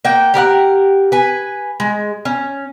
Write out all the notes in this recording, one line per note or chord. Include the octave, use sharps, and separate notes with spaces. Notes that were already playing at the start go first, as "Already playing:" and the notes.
A#3 F#5 G5
G4 A#4 D5 F#5
B4 G#5
G#3
C#4